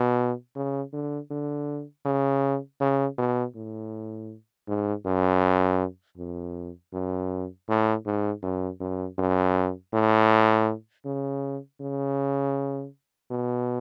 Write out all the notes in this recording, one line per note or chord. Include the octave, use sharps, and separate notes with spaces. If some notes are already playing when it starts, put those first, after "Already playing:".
Already playing: B2
C#3
D3
D3
C#3
C#3
B2
A2
G#2
F#2
F2
F#2
A2
G#2
F#2
F#2
F#2
A2
C#3
C#3
B2